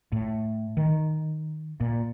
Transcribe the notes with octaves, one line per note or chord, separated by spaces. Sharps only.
A2
D#3
A#2